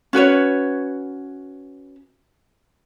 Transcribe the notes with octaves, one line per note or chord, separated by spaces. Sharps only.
C#4 F#4 B4 C#5